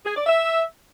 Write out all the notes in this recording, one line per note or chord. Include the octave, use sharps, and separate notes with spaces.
G#4
D5
E5